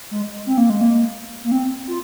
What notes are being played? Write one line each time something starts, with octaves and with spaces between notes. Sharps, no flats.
G#3
C4
A#3
G#3
A#3
A#3
C4
F4